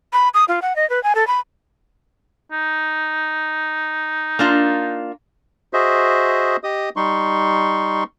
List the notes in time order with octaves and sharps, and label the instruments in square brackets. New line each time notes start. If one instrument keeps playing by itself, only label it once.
[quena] B5
D#6
F4
F#5
D#5
B4
G#5
A4
B5
[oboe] D#4
[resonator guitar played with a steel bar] A#3 D4 F4
[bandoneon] F#4 G#4 C5 D#5 E5
G4 D#5 D#6
G3 D#4 C6 C#6